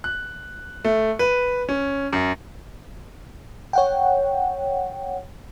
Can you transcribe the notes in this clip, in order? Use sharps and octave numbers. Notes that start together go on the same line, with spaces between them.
F#6
A3
B4
C#4
F#2
C#5 F#5 G5